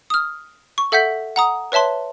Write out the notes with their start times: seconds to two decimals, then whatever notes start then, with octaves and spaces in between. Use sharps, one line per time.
0.10 D#6 F6
0.78 C#6
0.92 A4 E5 F#5 G6 B6
1.36 F#5 A#5 D#6
1.72 B4 C#5 E5 A5 C6